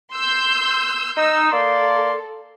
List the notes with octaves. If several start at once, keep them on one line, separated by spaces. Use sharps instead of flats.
C6 E6 G6
D#4 E6
A#3 A4 D5 C6